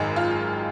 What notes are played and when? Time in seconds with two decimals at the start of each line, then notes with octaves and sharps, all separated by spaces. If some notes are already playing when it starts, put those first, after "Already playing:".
Already playing: G#1 F#2 D#3 G#3
0.16 F4